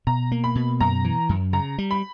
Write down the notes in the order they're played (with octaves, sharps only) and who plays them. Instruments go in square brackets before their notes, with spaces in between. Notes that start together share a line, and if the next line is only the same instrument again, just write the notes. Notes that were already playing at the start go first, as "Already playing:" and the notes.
[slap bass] B2 [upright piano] A#5
[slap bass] A#3
[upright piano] B5
[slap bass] B2
[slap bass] F#2 [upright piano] A#5
[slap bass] E3
F#2
[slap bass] C#3 [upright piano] A#5
[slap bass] G3
[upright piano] B5